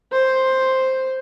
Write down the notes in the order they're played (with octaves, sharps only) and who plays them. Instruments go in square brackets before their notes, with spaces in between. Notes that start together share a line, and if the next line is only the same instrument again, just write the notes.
[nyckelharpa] C5